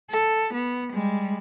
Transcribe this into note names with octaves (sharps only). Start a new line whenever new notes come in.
A4
B3
G3 G#3